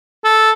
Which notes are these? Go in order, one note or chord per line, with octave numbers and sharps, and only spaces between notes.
A4